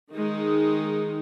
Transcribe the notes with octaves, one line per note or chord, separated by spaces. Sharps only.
D#3 G#3 D#4